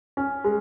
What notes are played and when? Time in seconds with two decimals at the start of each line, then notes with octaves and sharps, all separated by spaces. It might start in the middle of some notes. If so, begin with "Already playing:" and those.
0.17 C#4
0.44 G#3